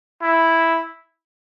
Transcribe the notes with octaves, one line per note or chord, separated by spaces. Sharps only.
E4